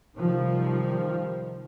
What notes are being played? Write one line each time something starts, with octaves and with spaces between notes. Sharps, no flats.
C3 D#3 F3 G3